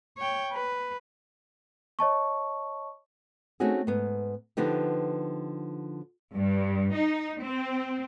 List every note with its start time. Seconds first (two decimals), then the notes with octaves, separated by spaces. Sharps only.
0.18 C#5 G5
0.52 B4
1.99 C#5 D#5 A5 C#6
3.60 A3 C4 C#4 D#4 F#4 G#4
3.87 G#2 B3
4.57 D3 F3 B3 D#4 G4
6.35 G2
6.94 D#4
7.41 C4